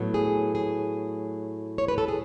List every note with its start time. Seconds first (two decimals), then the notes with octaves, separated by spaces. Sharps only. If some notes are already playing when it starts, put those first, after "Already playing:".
Already playing: A2 F#3 B3
0.14 G#4
0.55 G#4
1.78 C#5
1.88 B4
1.98 A4
2.08 G#4